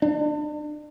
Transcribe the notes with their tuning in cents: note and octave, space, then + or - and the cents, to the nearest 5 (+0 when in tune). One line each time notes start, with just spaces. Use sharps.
D4 +35